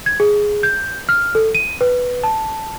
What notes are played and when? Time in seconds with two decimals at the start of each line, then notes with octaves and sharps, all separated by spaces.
0.06 G#6
0.20 G#4
0.63 G6
1.09 F6
1.35 A4
1.55 D#7
1.81 B4
2.24 A5